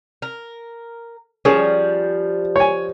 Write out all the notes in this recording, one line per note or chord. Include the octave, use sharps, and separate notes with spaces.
A#4
F3 G3 C#4 G#4
C#5 G#5